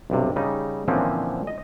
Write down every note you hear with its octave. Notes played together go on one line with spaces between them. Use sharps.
B1 G2 C3
C#3 G3 D#4
A#2 D3 E3 F3 C4 C#4
D#5